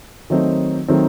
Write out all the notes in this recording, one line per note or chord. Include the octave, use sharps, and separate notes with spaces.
D#3 F#3 A3 C4 D#4
D#3 F#3 A3 C4 D#4